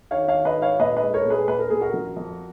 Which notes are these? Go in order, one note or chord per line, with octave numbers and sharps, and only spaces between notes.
D#3 C#5 F5
C#5 F5
D#3
B4 D#5
G#2
C#5 F5
A#2 B4 D#5
B4 D#5
G#3
A#4 C#5
A#2
G#4 B4
A#2 B4
A#4
A#2 G#4
F#4 A#4
F3
F2